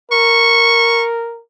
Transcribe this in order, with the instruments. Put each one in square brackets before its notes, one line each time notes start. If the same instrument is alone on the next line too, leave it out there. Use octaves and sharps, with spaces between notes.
[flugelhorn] A#4 [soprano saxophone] C#6